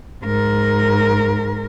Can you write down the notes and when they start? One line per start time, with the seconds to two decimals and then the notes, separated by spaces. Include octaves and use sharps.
0.24 G#2 A#4